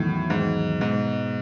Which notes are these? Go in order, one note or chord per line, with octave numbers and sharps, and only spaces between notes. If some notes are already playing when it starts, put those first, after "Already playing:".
Already playing: E2 A2 D#3 F#3
G#2
G#2 B2 G#3 D#4